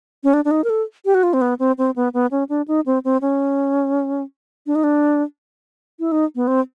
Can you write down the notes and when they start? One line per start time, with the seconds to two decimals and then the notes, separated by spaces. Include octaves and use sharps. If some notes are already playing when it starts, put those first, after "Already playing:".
0.24 C#4
0.34 D4
0.45 D4
0.51 D#4
0.64 A#4
0.70 A4
1.05 G4
1.15 F#4
1.23 F4
1.33 C4
1.41 B3
1.59 C4
1.78 C4
1.96 B3
2.14 B3
2.31 C#4
2.49 D4
2.68 D#4
2.86 C4
3.04 C4
3.21 C#4
4.67 D4
4.75 D#4
4.84 D4
6.00 E4
6.12 D#4
6.35 B3
6.47 C4